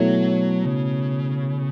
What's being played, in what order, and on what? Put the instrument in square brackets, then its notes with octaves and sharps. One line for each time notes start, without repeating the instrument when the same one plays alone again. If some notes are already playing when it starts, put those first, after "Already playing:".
Already playing: [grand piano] B2 A3 E4 A4 C#5 [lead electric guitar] F#3
[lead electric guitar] C#3